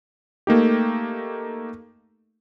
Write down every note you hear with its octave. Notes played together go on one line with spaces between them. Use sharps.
A3 A#3 D#4 G4